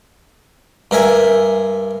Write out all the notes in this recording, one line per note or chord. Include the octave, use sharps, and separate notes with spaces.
G2 A#4 E5 G#5